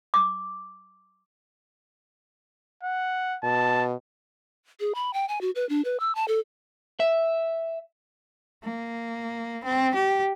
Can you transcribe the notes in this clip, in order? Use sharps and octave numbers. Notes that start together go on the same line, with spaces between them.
D6
F#5
B2 A5
G#4
B5
G5
G#5
F#4
B4
D4
B4
E6
A5
A4
E5
A#3
C4
G4